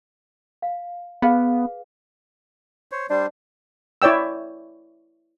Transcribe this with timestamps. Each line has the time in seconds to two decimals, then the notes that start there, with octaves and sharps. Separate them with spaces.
0.62 F5
1.22 B3 G#4 B4 F5
2.92 C5 C#5
3.10 G3 D4 C5
4.02 E4 C#5 D5 G5 E6